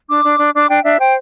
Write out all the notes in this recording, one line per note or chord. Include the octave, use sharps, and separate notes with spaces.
D4 D6
D4
D4
D4 D6
D4 G5
D4 E5
C5 G5